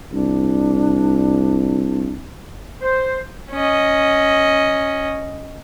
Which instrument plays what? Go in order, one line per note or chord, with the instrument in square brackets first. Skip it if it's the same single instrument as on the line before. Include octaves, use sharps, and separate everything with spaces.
[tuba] C2 [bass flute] D4
[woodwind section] C5
[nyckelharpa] C#4 D#5